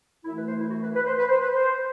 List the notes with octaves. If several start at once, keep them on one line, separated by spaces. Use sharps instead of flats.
F#2 E3 A3 E4
B4
C5
E4
F#4
B4
B4
C5
B4
C5
B4
C5